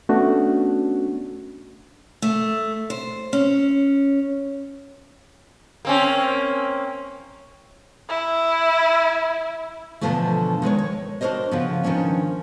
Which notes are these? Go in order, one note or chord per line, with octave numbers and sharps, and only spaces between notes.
A3 B3 C#4 D4 F#4
A3
C5
C#4
A#3 C4 C#4
E4
E2 G#2 B2 D3 F3 A3
D#3 G#3 B4 C#5
C#5
D4 F#4 A4 A#4 C5 D#5
C#3 F3 B3
D#3 F3 B3 C#4 D4